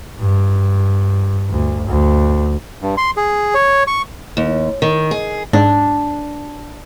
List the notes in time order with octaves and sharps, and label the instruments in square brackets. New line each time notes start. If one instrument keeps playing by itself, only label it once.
[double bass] G2
D2
D2
[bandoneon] G2
C6
G#4
C#5
C#6
[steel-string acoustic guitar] D#2
D#3
G#4
[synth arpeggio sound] G#2 [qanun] D4